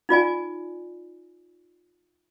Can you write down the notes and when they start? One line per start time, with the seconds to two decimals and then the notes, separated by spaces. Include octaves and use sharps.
0.09 D#4 F4 D5 G#5